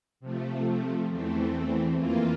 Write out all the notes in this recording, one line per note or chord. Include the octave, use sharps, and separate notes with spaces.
C3 F3 A3
E2 E3 A3 C4
F2 E3 A#3 F4